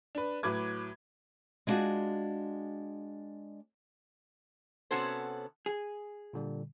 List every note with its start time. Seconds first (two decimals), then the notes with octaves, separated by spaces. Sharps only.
0.15 D4 B4
0.43 A2 F#3 B4 D6 G#6
1.67 G#3 B3 D4 F4 F#4 G#4
4.91 C3 B3 C#4 F#4 A4 C5
5.66 G#4
6.33 A#2 D3 G3